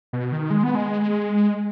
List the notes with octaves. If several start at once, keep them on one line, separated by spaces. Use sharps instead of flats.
B2
D#3
G#3
B3
G#3